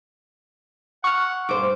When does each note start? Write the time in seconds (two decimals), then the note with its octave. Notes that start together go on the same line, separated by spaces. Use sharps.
1.04 F#5 C#6 F6
1.49 G2 C5 D6